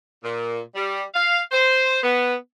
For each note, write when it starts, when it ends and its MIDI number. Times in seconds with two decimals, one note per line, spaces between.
0.23 0.59 46
0.75 1.04 55
1.14 1.42 77
1.52 1.99 72
2.03 2.34 59